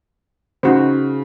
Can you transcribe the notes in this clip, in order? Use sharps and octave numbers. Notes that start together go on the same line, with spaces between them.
C#3 D#4 F#4 C5